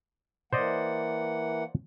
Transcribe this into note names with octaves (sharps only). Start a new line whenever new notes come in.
E3 A#3 C5 D5 D#5 F#5